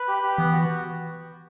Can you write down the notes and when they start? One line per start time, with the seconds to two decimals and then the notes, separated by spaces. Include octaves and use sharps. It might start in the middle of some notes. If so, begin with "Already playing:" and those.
Already playing: B4
0.08 G4
0.23 G4
0.38 E3 B3
0.53 F#4